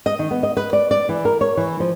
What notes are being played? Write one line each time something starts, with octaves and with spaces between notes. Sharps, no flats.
D#5
D#3
B3
D#5
B4
D5
D5
E3
A#4
C#5
E3
F3